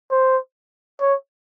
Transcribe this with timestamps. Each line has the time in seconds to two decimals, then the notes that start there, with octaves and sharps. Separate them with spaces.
0.11 C5
1.00 C#5